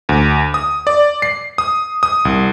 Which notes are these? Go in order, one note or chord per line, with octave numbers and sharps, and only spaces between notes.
D2
D#6
D5
C7
D#6
D#6
C2